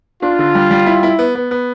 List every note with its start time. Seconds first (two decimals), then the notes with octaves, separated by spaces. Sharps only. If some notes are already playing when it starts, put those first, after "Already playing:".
0.22 D4 F4
0.39 D3
0.55 G3
0.71 G3
0.86 E4
1.03 E4
1.19 B3
1.35 B3
1.51 B3